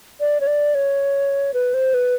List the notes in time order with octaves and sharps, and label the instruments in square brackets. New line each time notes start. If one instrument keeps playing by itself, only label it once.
[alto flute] D5
C#5
D5
C#5
B4
C5
B4